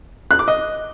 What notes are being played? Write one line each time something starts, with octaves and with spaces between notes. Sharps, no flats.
F#6
D6
D#5